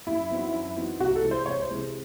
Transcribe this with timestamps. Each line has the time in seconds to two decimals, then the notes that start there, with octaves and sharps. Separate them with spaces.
0.07 F#2 E4
0.30 E3 C4 D#4 F#4
0.53 F#2
0.76 E3 C4 D#4 F#4
1.00 C2 F#4
1.16 A4
1.23 C3 E3 G#3
1.31 C5
1.46 C2 C#5
1.61 C5
1.70 C3 E3 G#3